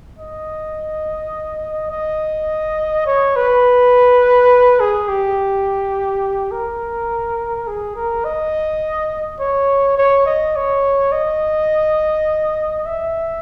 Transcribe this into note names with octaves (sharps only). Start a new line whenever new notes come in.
D#5
D#5
C#5
B4
G#4
G4
A#4
G#4
A#4
D#5
C#5
C#5
D#5
C#5
D#5
E5